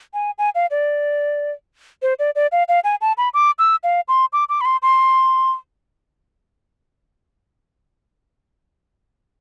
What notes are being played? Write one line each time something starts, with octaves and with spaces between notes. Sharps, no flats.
G#5
G#5
F5
D5
C5
D5
D5
F5
F5
G#5
A5
B5
D6
E6
F5
C6
D6
D6
B5
C6
C6